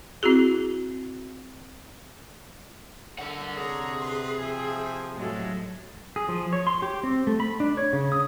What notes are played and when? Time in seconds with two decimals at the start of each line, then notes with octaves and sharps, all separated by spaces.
0.23 C4 E4 F#4 G#4
3.19 D3 A#4 F#5
3.57 C3 G#4 C#5 A#5
3.99 B4 C6
4.39 F3 E5 G5 G#5
5.17 A2 F#3 G#3 A4
6.16 G#4
6.29 F3
6.53 C#5
6.67 C6
6.82 G4
7.04 C4
7.27 A3
7.40 B5
7.60 D4
7.77 C#5
7.93 C#3
8.12 D#6